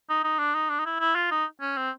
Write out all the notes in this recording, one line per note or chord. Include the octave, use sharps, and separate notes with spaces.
D#4
D#4
D4
D#4
D4
D#4
E4
E4
F4
D#4
C#4
C4